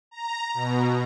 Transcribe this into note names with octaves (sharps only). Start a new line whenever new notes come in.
A#5
B2